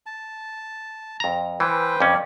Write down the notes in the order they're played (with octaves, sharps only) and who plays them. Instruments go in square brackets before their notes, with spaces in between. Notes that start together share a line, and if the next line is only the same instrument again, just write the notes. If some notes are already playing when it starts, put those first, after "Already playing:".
[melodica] A5
[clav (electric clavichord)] F2 A#5
[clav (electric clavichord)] E3 [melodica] B4 C5 G5
[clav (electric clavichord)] F2 C#4 [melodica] D5